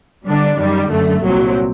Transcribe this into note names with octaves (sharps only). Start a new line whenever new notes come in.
D3 G3 D4
F#2 D#3 G3
F#2 D3 A3
C2 A#2 F#3 C4